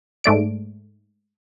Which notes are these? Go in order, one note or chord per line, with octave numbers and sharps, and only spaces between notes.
G#2 A3 D5 D7